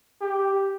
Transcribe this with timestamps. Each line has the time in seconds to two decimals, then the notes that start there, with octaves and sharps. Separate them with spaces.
0.21 G4